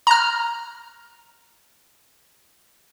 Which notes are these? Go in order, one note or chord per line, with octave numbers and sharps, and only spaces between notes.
A#5 F6